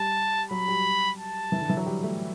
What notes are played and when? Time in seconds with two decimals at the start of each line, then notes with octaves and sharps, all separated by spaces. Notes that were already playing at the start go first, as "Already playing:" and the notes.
Already playing: G3 A5
0.51 F#3 B5
0.68 G3
1.18 A5
1.52 E3
1.61 D3
1.69 E3
1.77 F#3
1.86 G3
2.03 A3